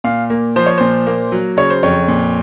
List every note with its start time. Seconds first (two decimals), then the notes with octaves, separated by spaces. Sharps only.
0.04 A#2 F5
0.30 A#3
0.56 F3 C5
0.66 C#5
0.78 A#2 C5
1.07 A#3
1.32 F#3
1.57 C#3 C#5
1.70 C5
1.83 F2 C#5
2.08 A#2